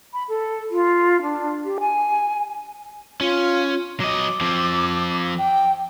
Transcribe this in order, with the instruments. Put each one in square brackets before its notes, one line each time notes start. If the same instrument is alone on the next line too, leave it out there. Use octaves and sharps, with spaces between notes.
[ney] B5
A4
F4
D4
G4
G#5
[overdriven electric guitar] C#4 [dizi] F4
[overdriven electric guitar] F#3 D#5 [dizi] D6
[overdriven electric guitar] F3 C4
[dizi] G5